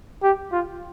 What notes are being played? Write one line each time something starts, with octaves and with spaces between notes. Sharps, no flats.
G4
F4